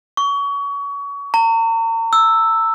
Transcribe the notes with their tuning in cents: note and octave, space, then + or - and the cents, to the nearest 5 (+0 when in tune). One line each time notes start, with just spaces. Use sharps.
C#6 +30
A#5 -40
E6 +0